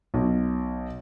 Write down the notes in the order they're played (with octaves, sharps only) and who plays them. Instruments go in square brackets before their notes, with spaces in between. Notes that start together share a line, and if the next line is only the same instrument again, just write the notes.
[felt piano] B1